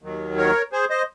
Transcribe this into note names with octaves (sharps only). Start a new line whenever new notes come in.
D#2 D#3 F#3
A#4 C#5
G#4 C5
C5 D#5